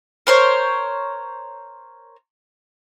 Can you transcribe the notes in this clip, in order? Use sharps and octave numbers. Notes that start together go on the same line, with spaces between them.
A#4 C5 C#5